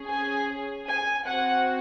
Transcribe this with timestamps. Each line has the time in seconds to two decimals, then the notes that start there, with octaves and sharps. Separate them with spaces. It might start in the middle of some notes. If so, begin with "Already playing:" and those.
Already playing: C#4 G#4
0.09 G#5
0.87 G#5
1.26 C4 F#4 F#5